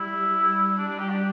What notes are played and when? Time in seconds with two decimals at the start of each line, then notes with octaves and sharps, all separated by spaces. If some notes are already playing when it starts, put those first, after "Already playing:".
Already playing: G3 E4
0.35 G3
0.77 D4
0.88 D4
0.99 G4
1.09 D4